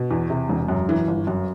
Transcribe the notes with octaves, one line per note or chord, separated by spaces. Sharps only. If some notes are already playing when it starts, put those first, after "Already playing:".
Already playing: B2
E2
C3
E1
F#2
E3
G1
F#2